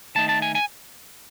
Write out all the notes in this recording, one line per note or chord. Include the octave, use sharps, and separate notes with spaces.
D#3 A3 D#4 A5
A5
G#5
G#5